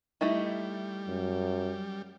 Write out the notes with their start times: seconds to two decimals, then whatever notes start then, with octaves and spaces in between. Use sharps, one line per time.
0.21 G3 A3 D#4 E4
1.08 F#2